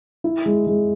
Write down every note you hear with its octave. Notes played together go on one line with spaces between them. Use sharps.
E4
G#3
G#3